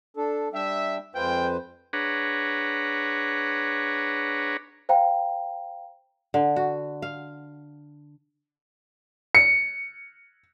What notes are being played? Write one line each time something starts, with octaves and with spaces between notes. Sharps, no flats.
D4 A4
G3 D4 E5 G5
F2 G#3 F4 B4 C5 G5
D4 G#4 B4 C#5 F#5 A#5
C5 F5 G5 A#5
D3
F#4
F5
C#7